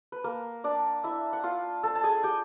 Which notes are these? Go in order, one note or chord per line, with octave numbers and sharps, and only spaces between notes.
B4
A#3 A#4
D4 D5
E4 E5
F#5
F4 F5
A4 A5
A5
G#4 G#5
G4 G5